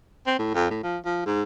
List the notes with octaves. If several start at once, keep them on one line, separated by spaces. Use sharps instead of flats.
C4
A2
F2
A2
F3
F3
G#2